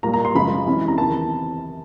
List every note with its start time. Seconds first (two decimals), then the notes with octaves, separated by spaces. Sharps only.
0.03 A#2 G3 A#3 A#5
0.14 A#5
0.25 C6
0.35 F#2 C#3 F3 G#3 B5
0.66 C3 E3 G#3 C#4
0.88 A#5
0.98 E2 C3 D#3 A5